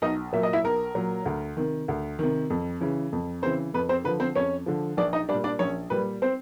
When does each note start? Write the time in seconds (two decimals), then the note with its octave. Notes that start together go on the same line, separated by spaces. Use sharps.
0.02 B1 D#4 D#5
0.33 A#2 F#3 E5
0.43 D#5
0.53 E4 E5
0.64 B1 A#4
0.95 A#2 F#3
1.26 D2
1.57 C3 D#3
1.88 D2
2.19 C3 D#3
2.50 F2
2.81 C#3 E3
3.12 F2
3.42 C#3 E3 C4 C5
3.74 F2 B4
3.89 C4 C5
4.04 D3 F3 B4
4.20 C4 C5
4.36 F2 C#4 C#5
4.66 D3 F3
4.97 A#1 D4 D5
5.13 D#4 D#5
5.29 A#2 G3 D4 D5
5.44 D4 D5
5.59 A#1 C#4 C#5
5.90 A#2 G3 B4
6.22 C4 C5